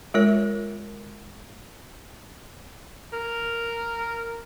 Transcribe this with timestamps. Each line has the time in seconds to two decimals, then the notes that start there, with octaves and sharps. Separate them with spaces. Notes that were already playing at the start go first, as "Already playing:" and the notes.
0.14 G#3 F4 A#4 C#5
3.13 A#4